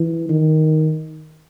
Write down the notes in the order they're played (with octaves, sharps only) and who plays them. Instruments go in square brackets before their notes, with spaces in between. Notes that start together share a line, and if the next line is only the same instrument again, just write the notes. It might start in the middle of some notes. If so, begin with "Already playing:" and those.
Already playing: [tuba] E3
D#3